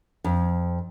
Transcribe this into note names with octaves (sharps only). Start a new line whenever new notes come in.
F2